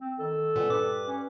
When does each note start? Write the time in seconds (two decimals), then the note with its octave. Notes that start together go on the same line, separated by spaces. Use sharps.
0.01 C4
0.19 D#3 A4
0.56 A#2 G3 B3 C#4
0.70 G2 B4 D6
1.07 C#4